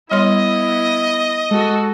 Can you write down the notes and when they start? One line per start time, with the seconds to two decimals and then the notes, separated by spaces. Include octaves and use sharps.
0.12 G3 B3 E4 C#5 D#5 C6
1.51 G#3 F#4 A4